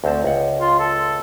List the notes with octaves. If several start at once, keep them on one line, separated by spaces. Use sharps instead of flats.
D2 C4 A5
C#2 F#5
F4
A4